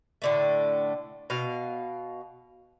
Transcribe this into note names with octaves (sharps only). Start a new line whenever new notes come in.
A2 D3 A3
B2 F5